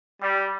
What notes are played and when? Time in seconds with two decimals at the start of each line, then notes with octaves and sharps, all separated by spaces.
0.20 G3